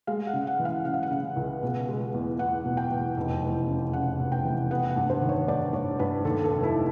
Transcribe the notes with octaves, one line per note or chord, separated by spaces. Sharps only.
G#3 F5
F#5
C#3
F#5
E3
F5
C#3 F#5
F5
F#5
C#3
C#2
B2
G#3
E2
E2 F#5
B2
G5
E2
F1
E2
C#3
C#3 F#5
F1
G5
E3
B3 F#5
F#5
G2
C5
D#3
C#5
G2 D5
G2 C#5
G2 B4
D#2 A4
A4
F1
E4